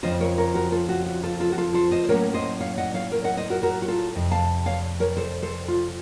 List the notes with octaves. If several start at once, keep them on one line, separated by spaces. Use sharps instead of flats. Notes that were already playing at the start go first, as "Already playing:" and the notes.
F2 C#3 F3 C4 F4 C5 D#5
A#4 C#5
A#4 C#5
F#4 A#4
F4 A4
F#4
F#4
F4 A4
F4 A4
F#4
F4 A4
A4 C5
C5 D#5
C5
A2 F#3 A#3 C#4 A#4 C#5
C5 D#5
C#5 F5
D#5 F#5
C#5 F5
A#4 C#5
D#5 F#5
C5 D#5
F#4 A#4
F#4 A#4
F#4
F4 A4
F2 C3
F5 A5
C#5 F5
A#4 C#5
A4 C5
A4 C5
F4